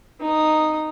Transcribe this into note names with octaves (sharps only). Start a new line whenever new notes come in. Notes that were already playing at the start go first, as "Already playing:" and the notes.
D#4 D#6